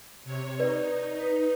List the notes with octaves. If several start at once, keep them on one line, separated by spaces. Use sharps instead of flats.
C3 C#5
D#4 B4 D5
B4